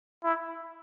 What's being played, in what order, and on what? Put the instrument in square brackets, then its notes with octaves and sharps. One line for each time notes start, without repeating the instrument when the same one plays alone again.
[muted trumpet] E4